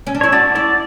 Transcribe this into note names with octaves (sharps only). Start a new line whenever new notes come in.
C#4
D4
E4 C#5
F#4 D5
E4 D5